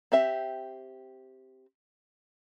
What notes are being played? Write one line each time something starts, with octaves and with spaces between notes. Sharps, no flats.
C4 G4 E5